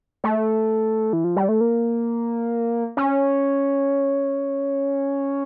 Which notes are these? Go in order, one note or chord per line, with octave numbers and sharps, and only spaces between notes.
A3
E3
F3
G3
A3
A#3
C#4